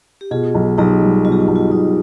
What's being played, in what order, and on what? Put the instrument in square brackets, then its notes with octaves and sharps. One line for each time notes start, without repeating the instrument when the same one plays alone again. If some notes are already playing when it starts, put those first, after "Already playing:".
[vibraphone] G4
[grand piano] B2 [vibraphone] F4 G#4
[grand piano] B1
[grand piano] B1 [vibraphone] D#4 G4
[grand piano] G3
[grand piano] B2 [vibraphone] F4
[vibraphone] G4
F4
[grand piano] B1 [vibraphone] G4
[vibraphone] F4
[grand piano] B1 [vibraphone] D#4